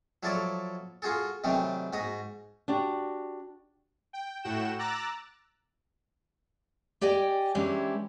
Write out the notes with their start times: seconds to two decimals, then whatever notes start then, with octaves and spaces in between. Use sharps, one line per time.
0.23 F3 F#3 E4 A4 C#5 D5
1.02 F4 F#4 G#4 A4
1.44 C3 D#3 E3 F#3 G3 A3
1.93 G#2 F#4 A#5 D#6
2.68 D4 F#4 G4
4.13 G5
4.43 A2 F#4 F#5 G5 E7
4.79 A#5 D6 E6 F#6 A6
7.01 G4 D5 D#5 G5 G#5
7.55 E3 G#3 C#4 D4 E4 G4